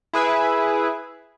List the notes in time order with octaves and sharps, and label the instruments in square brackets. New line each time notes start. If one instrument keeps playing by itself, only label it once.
[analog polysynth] E4 G#4 B4 E5